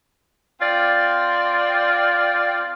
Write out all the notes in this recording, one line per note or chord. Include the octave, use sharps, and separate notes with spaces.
C4 F4 D5